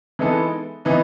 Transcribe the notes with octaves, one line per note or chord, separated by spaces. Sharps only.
E3 G#3 B3 D#4 A4
E3 B3 D#4